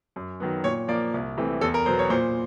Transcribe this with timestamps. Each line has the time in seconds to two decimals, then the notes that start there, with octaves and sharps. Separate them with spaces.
0.16 F#2
0.40 D#3 F#3 B3
0.64 A#2 C#5
0.88 F3 A#3 D5
1.14 C2
1.37 C3 E3 A3
1.61 E2 A4
1.74 A#4
1.86 B2 F#3 B3 C5
1.99 C#5
2.10 A#2 C5